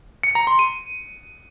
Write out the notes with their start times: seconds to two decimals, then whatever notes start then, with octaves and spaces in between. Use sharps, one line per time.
0.23 C#7
0.35 A#5
0.47 C6
0.59 D#7